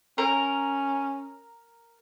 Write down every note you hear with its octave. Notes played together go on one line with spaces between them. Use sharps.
C#4 A#4